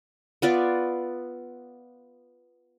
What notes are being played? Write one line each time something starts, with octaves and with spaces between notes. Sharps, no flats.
B3 F4 D5 E5